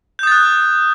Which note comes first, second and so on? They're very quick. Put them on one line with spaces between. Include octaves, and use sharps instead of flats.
G6 D#6 A6 F#6